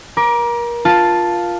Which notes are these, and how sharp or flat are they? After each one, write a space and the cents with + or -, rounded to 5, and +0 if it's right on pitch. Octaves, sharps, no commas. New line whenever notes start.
A#4 +30 D6 +0
F4 +0 A5 +0